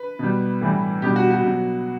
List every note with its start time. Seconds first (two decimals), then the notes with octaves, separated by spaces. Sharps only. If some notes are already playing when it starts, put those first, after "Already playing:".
Already playing: B4
0.19 B2 G3
0.61 A2 E3 G3
1.02 B2 G3 G4
1.16 F#4
1.31 F#4
1.44 B2 F#3